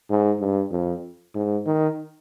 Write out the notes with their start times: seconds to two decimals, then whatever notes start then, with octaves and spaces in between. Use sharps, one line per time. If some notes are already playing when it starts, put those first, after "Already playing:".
0.10 G#2
0.40 G2
0.71 F2
1.35 G#2
1.66 D#3